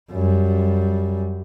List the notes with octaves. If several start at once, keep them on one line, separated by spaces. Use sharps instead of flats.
F#2 G3